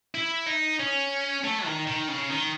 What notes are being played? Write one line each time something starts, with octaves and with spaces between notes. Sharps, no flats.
E4
D#4
C#4
A3
D#3
D#3
C#3
D#3